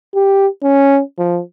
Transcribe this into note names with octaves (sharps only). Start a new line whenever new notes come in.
G4
C#4
F3